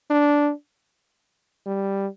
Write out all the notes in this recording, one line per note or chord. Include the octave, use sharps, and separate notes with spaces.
D4
G3